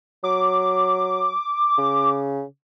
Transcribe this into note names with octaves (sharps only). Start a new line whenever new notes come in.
F#3 D6
C#3